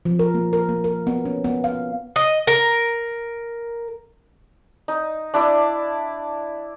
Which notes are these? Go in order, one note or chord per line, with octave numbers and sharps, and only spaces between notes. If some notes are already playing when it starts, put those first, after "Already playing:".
F3
A#4
A#3
A#4
A#3
A#4
B3
C#4
B3
F5
D#5
A#4
D#4
D4 E4 D5